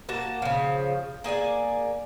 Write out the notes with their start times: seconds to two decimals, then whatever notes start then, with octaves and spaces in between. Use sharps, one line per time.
0.09 A#3 F#4 A5
0.42 C#3 F3
1.24 A#3 G#4 D5 G#5